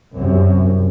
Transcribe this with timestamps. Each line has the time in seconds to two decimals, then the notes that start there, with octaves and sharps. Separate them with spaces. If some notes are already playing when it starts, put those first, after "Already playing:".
0.15 C2 F#2 C3